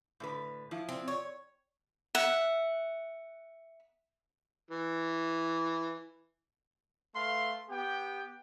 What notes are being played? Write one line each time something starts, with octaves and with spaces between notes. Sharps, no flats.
A2 D3 B4
F3 E4
C4
C#5
E5 F#5
E3
A3 B4 F5 C6
B3 G4 G5